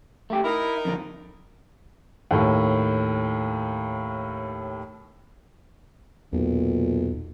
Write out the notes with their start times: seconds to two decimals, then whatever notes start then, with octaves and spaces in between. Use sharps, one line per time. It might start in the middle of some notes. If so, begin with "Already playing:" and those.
0.30 A3 G4
0.44 D#4 E4 A#4
0.85 F2 D3
2.31 D#2 A2
6.33 B1 E2 A#2